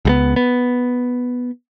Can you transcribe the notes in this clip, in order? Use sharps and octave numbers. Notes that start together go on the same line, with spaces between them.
C#2 G3 B3
B3